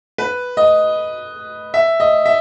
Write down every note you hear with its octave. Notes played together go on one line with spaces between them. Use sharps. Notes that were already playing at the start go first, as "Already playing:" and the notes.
B4
D#5
E5
D#5
E5